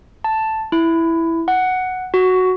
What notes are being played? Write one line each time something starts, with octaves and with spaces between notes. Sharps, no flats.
A5
E4
F#5
F#4